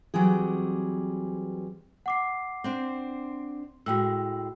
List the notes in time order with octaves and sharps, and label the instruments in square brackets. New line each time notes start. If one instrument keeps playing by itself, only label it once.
[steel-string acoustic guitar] E3 F#3 G3 C4 G#4
[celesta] F#5 D6 C7
[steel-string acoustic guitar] C4 D4 C5
[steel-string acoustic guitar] A2 G#3 [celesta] F#4 G5 E6